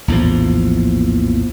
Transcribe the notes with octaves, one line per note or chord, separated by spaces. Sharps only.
A#1 E2 A2 F3